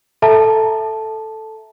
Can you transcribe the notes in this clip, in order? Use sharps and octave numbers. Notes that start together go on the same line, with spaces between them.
A4 E5 A5 A#5